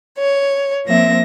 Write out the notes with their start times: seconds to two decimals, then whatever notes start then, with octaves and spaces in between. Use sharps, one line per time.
0.19 C#5
0.86 F3 A#3 C4 E5 A#6